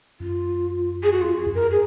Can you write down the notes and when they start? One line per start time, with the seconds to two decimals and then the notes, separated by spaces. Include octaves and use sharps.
0.20 F#2 F4
1.03 G#4
1.12 F#4
1.21 F2 F4
1.38 G#4
1.46 F#2
1.55 A#4
1.71 G#4